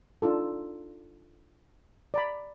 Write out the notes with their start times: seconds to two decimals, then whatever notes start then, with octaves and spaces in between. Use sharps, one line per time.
0.22 D4 D#4 F4 A4
2.14 D5 A#5 B5